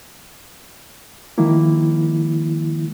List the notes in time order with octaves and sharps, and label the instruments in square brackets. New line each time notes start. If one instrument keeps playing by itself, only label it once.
[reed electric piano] D#3 F3 G#3 A#3 E4